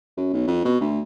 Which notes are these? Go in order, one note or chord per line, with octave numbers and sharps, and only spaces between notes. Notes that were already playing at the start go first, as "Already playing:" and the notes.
F#2
B1
F2
B2
D2